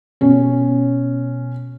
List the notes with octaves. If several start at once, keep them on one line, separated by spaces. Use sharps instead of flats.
B2 C#4